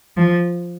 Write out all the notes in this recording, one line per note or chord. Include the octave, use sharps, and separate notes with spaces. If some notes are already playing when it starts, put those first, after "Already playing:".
F3